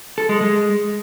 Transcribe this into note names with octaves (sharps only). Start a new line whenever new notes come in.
A4
G#3
G#3